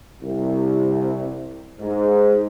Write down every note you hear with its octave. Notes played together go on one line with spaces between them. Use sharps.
C2
G#2